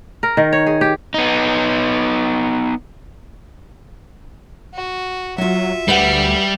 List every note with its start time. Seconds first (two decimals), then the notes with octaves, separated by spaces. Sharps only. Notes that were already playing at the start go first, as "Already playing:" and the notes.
0.23 A#4
0.37 D#3
0.53 C#5
0.66 G#4
0.81 G4
1.14 B3 D#4
4.74 F#4
5.38 F#3 F4 F#4 E5
5.88 D2 G3 G4 B4 F#5